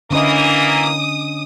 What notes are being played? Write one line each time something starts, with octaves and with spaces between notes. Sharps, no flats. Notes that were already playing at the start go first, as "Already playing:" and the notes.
D3 E3 A#3 C#4 D#5 D#6